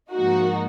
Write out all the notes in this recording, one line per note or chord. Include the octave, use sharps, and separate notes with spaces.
G#2 F3 A#3 D#4 F#4